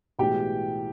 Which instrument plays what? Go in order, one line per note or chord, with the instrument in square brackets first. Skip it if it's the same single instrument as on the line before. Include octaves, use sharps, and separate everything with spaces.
[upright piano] B1 A2 E3 G#3 G4 G5